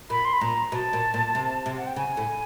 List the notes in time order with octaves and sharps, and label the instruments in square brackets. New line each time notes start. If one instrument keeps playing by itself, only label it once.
[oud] A#2 [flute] B5
[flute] C6
B5
[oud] A#2 [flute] A#5
[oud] B2 [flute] A5
[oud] A#2
A#2
C3
C3
[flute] F#5
G5
[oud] C#3 [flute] G#5
[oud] A2